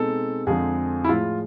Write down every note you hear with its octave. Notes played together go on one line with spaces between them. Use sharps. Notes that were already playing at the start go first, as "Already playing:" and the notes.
Already playing: B2 G#3 C4 D#4 A4
F2 D3 F3 G#3 C4 G#4
E4
A2 F3 G#3 F4